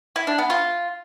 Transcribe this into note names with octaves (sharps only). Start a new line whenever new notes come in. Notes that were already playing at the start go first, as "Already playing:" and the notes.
E4
D4
B3
F4